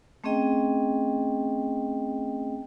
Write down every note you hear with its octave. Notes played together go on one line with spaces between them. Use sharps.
A3 C4 C#4 G#4 D#5 G5